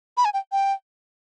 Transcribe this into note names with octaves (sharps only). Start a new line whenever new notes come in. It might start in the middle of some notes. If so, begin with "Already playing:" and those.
B5
G#5
G5
G5